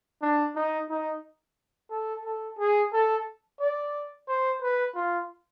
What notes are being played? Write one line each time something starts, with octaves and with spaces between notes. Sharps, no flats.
D4
D#4
D#4
A4
A4
G#4
A4
D5
C5
B4
F4